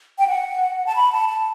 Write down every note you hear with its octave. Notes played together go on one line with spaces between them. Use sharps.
G5
F#5
A5
B5
A5
A5